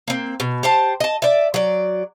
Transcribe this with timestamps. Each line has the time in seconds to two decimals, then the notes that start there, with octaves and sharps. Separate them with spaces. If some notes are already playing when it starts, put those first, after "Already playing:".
0.08 A#3 C4
0.40 B2
0.63 G4 C5 A5
1.00 D#5 A5
1.22 D5 E5
1.54 F#3 D5